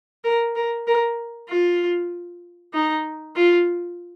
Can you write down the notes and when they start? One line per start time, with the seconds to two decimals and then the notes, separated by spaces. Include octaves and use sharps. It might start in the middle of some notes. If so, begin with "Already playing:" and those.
0.24 A#4
0.56 A#4
0.87 A#4
1.49 F4
2.74 D#4
3.36 F4